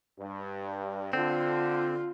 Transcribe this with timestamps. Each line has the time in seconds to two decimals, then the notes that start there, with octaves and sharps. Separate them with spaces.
0.18 G2
1.13 D3 C4 F4